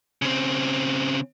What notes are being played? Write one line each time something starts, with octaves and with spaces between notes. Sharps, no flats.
C#3 C4